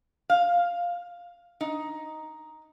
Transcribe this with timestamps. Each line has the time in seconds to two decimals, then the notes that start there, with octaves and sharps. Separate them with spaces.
0.30 F5
1.61 D#4